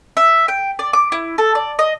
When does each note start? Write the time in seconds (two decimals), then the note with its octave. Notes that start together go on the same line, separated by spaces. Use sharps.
0.17 E5
0.48 G5
0.79 D5
0.93 D6
1.12 E4
1.38 A4
1.55 D5
1.79 D#5